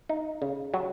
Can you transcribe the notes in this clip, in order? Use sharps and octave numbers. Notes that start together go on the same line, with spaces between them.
D#4
C#3
F#3